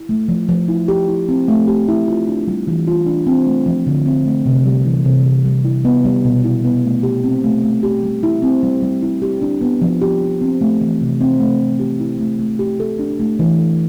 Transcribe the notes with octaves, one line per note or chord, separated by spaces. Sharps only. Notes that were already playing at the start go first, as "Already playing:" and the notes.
Already playing: E4
A3
F3
F3
E4
G4
E4
C4
A3
G4
E4
F4
D4
G3
E3
F4
D4
C4
A3
F3
D3
C4
A3
C3
G3
E3
C3
C3
G3
E4
B3
G3
B2
E4
B3
A3
G4
C4
A3
A3
G4
G3
E4
C4
G3
G3
E4
G4
D4
B3
F3
G4
D4
C4
A3
E3
C3
C4
A3
A3
G4
E4
A3
A3
G4
A4
D4
A3
E3
A4